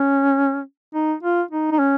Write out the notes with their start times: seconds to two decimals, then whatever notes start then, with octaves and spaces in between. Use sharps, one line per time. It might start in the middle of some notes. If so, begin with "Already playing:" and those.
Already playing: C#4
0.94 D#4
1.23 F4
1.51 D#4
1.72 D#4
1.79 C#4